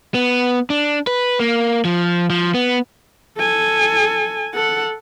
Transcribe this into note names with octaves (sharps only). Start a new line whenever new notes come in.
B3
D4
B4
A#3
F3
F3
B3
A4 G#5
A4 F#5